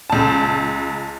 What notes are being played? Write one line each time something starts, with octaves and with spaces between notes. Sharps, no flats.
C#2 A5